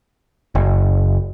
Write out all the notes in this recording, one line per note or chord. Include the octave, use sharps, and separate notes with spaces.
F#1